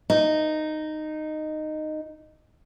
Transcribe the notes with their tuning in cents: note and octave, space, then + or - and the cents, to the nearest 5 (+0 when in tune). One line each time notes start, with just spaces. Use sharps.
D#4 -10